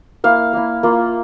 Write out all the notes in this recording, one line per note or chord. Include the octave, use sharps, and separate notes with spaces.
A#3 E4 F5
A#3 E4
A#3 F4